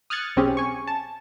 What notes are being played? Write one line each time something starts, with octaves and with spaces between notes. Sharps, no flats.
D#6 F6 F#6 G#6 A6 C#7
B1 C4 C#4 G4 G#4
G#5 C#6
A5